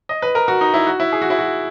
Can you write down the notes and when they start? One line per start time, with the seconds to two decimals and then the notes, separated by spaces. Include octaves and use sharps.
0.09 D#5
0.22 B4
0.35 A#4
0.48 F#4
0.61 D#4
0.74 E4
0.87 F#4
1.00 E4
1.12 G#4
1.22 F#4
1.30 E4
1.39 F#4